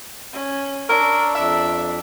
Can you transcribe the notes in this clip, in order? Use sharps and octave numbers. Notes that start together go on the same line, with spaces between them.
C#4
D4 A#4 C#6 E6
F2 E5